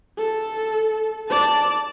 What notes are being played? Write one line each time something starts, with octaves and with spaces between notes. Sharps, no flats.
A4
D5 A5